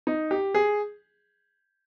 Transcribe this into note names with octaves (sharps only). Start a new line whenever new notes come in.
D#4
G4
G#4